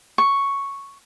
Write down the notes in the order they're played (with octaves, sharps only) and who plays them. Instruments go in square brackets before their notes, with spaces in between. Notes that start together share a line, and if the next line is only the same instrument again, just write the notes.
[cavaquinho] C#6